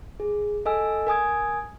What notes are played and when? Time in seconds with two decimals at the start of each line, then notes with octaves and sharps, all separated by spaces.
0.20 G#4
0.66 A4 D#5 G#5 E6
1.07 A#4 G#5 D#6 G#6